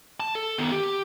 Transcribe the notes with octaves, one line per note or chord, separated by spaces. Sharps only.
A5
A4
D#3 B3
G4